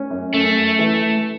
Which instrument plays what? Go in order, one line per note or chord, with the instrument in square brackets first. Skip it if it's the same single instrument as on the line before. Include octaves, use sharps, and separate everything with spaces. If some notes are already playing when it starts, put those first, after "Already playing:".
Already playing: [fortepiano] C#4
F#2
[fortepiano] F#2 [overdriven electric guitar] A3
[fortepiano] F#2
E3